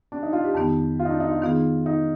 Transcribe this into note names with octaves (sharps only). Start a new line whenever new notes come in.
D4
D#4
F4
G4
F2 D#3 B3 D#4 G4
F4
D#4
D4
D#4
F4
D#3 B3 D#4 F4 G#4
D#4